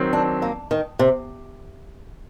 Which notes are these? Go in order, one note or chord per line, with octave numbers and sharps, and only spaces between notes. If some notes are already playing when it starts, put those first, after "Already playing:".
Already playing: D#3 F#3 C4
D4
A#3
D#3
C3